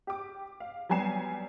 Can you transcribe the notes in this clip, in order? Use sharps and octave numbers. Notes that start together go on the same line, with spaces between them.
G4 D6
F5
F#3 G3 B3 G#5 C7 E7